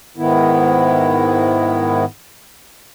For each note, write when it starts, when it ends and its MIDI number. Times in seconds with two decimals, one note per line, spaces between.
0.17 2.05 44
0.17 2.05 51
0.17 2.05 59
0.17 2.05 64